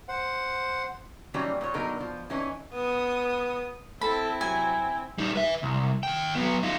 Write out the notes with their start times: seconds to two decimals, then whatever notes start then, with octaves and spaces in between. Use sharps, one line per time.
0.08 C5 F#5
1.34 D#3 E3 F#3 G3 A#3 C#4
1.61 A#2 C#5
1.74 B2 D3 F#3 D#4 A#4
2.01 F3
2.30 E3 C#4 D#4
2.73 B3 D#6
4.01 C4 E4 A4 B5
4.41 C3 F#3 G#5
5.18 G3 D#4
5.35 B4 E5
5.63 C2
6.03 D#2 G5
6.36 F#3 B3
6.63 D#4 F4